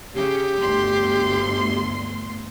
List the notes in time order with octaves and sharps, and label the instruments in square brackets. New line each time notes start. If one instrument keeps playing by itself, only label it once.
[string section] C#3 [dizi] G4
[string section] G1 D2 C6